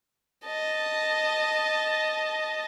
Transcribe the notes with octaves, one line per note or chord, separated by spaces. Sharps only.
D#5 A5